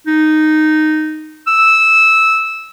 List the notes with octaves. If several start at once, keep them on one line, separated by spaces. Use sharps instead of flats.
D#4
E6